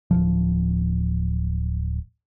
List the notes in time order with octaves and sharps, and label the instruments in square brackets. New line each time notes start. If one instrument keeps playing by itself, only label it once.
[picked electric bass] D1 C#2 F3